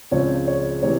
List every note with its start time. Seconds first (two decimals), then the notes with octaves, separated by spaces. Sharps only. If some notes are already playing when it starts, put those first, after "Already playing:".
0.11 C#2 C#3 F3 C4 C#5
0.47 C#5
0.83 C3 E3 C#5